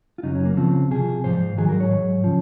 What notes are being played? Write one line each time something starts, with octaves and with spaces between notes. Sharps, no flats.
F4
F#2 C#3 F#3 D#4
C#4
A#3
C#2 C#3 F3 C4
C2 C3 F3 G#4
G#2 F3 C5
G#2 D#3 F#3 G#4
A#4
C#5
G#2 F#3
C#3 F3